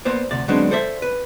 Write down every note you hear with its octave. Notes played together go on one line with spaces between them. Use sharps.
A#3 B3 C5 D5
D2 C3 D5
D3 F#3 G#3 B3 C4 D4
A4 C5 D5 E5
B4